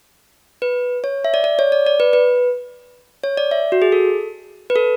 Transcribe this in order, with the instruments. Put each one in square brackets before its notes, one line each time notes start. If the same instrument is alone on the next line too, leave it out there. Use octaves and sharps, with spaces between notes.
[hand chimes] B4
C#5
E5
D5
D5
C#5
D5
D5
B4
B4
C#5
D5
E5
F#4
G#4
A4
B4
A4